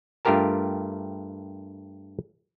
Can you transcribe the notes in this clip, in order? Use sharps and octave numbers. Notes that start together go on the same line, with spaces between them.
G2 A3 F4 G4 A#4 A5